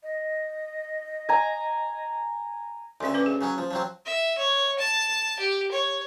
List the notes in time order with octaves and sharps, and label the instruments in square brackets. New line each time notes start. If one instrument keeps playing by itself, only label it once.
[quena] D#5
[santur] G#5 A#5
[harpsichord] D2 C#3 E5 [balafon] C#4 C6
[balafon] C#4 B4 D6
G#4
[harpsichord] C#3 F#3 C#4
F3
F3 F#3 C4
[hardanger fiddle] E5
C#5
A5
G4
C#5